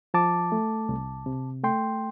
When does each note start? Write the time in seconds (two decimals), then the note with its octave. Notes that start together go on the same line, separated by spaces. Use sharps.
0.14 F3 A5 D6
0.52 A3
0.89 C2
1.26 C3
1.63 A3 G5 C6